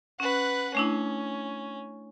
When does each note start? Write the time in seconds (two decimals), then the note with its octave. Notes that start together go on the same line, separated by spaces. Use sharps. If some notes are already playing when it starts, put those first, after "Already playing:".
0.20 C#4 B4 F#5
0.75 A3 C#4 D4 E4